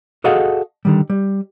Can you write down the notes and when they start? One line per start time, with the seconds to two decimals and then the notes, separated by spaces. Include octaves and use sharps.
0.24 F#4 G#4 A4 D#5 F5 F#5
0.85 D3 D#3 G3
1.10 G3